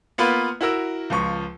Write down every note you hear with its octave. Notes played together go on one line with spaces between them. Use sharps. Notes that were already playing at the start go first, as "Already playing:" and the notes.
A#3 B3 F4 B4
E4 F#4 A#4 E6
C#2 F3 C#6